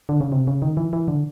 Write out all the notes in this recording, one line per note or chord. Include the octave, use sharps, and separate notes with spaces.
D3
C#3
C3
C#3
D#3
E3
E3
D3